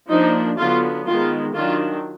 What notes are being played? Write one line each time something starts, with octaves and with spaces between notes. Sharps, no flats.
F3 A#3 D4 D#4
D3 F#3 B3 F4
D#3 G#3 B3 F4
D#3 F#3 D4 F4